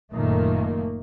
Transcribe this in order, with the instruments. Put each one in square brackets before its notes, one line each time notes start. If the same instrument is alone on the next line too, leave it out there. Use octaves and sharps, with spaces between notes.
[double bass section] F#1 A#2 D#3 A3 A#3